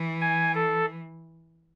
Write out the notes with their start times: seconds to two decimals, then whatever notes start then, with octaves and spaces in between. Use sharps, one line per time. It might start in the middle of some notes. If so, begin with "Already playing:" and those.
Already playing: E3
0.21 G#5
0.55 A4